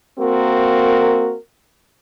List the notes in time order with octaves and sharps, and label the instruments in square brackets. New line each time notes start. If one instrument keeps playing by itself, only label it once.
[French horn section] A#3 C4 F#4 A#4